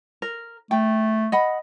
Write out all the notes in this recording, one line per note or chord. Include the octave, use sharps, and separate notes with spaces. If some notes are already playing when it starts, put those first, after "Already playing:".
A#4
A3 G5
D#5 F#5 B5